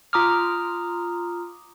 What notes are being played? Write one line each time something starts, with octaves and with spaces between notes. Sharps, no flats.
F4 A#5 D6 D#6 F6